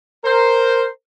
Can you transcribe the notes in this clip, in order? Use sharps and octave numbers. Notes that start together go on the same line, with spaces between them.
A#4 C5